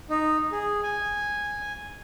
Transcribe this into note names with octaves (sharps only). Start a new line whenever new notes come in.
D#4
G#4
G#5